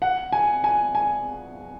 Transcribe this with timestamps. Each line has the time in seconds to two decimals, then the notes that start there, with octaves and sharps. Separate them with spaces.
0.02 F#5
0.32 G#5
0.64 G#5
0.95 G#5